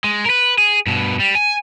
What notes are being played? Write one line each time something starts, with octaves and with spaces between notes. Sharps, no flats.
G#3
A#4 B4
G#4
G2 B2
G3
G#5